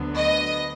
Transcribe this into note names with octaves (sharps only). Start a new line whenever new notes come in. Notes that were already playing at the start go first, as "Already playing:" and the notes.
Already playing: D2 D3 F#3 B3
D#5